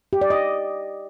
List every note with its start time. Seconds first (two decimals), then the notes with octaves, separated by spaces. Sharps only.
0.13 G4
0.22 D5
0.30 D#5